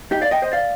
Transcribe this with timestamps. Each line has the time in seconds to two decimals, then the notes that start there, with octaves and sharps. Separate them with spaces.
0.11 D#4 G4
0.21 D5 F5
0.31 D#5 G5
0.42 C5 D#5
0.52 D5 F5